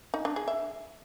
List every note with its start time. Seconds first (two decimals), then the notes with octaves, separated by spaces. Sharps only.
0.14 D#4
0.25 D4
0.36 G#4
0.48 E5